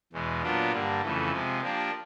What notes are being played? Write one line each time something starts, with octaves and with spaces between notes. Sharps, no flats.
E2 B2 G#3
A#2 F#3 B3 D4 F4
G2 D3 G3 A#3
F2 C#3 E3 A3
C3 F3 G#3
F3 A#3 D4 G4